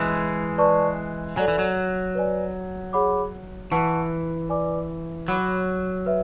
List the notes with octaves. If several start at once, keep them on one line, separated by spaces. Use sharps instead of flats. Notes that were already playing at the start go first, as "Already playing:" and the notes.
Already playing: E3 G#3
B4 D5 A5 C#6
F#3 A4 D5 G#5
E3
F#3
B4 D5 G#5
G#4 C#5 F#5 B5 D6
E3 B4 F#5 A5 C#6
B4 D5 G#5 D6
F#3 C#5 F#5 B5 D6
B4 E5